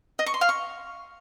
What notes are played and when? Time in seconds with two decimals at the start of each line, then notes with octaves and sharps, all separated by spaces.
0.19 D#5
0.26 C#6
0.34 C6
0.41 F5
0.49 C#6